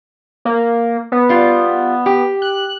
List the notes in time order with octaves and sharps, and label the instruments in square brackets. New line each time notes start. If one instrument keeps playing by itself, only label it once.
[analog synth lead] A#3
B3
[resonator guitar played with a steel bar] G3 F4
G4
[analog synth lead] F#6